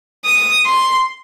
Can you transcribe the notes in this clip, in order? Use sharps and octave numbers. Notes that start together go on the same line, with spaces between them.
D#6
C6